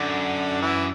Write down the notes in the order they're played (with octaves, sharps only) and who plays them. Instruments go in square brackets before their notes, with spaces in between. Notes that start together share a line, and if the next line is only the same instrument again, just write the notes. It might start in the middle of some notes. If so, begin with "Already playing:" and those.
Already playing: [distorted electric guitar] F#2 [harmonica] D3 D4
[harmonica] E3 E4